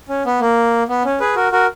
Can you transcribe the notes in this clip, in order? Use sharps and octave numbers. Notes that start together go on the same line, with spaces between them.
C#4
B3
A#3
B3
C#4
G#4 B4
F#4 A#4
F#4 A#4